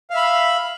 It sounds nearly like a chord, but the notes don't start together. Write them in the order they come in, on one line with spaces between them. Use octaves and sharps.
F5 E5 B5